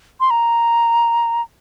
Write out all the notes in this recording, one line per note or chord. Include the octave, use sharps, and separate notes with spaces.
C6
A#5